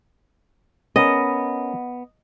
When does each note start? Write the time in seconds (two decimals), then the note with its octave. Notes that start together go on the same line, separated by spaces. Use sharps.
0.96 B3 C#4 A#4 D#5